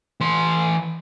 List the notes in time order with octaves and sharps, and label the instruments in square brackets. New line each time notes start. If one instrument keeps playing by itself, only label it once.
[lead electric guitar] E3 C6